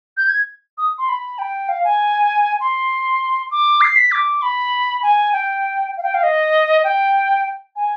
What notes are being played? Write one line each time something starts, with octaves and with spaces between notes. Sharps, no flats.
G6
G#6
D#6
C6
B5
G5
F5
G#5
C6
D6
C7
B6
D6
B5
G#5
G5
F5
G5
F5
D#5
G5
G#5